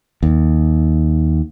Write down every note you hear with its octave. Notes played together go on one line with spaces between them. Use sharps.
D#2